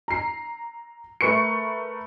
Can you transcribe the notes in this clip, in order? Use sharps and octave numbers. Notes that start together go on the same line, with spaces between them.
A#5 C7
A3 A#4 B4 C#6 C#7